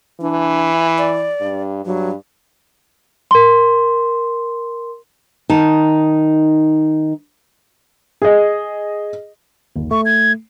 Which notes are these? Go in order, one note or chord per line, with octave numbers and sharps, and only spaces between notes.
E3 D4
D5
G2
G2 F#3
A#4 C6
D#3 D#4 A5
G#4 D#5
G1 D#2
A3 C#6
G#6